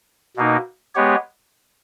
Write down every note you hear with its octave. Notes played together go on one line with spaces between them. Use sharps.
B2 A#3 D#4
G#3 B3 G4 C#5